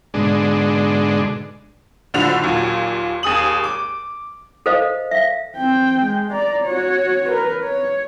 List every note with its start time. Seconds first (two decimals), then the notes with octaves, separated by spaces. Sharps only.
0.14 G#2 B2 D3 G#3 D4
2.14 F#1 A2 D3 F3 F#4 F7
2.42 D#2 A#2 F#3
3.23 D#2 G#4 D#6 F#7
3.64 D6
4.66 A4 A#4 C5 D#5 F5
5.11 E5 F5
5.56 C4 G5
6.02 G#3
6.32 D5 A#5
6.64 F#4 C#5
7.29 A#4 B4
7.64 C#5